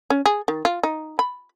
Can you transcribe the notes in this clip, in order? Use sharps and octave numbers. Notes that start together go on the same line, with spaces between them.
C#4
G#4
D#3
F4
D#4
B5